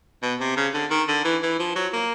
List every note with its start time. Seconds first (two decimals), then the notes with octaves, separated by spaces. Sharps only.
0.22 B2
0.40 C3
0.56 C#3
0.74 D3
0.91 D#3
1.08 D3
1.25 E3
1.43 E3
1.59 F3
1.76 F#3
1.93 A#3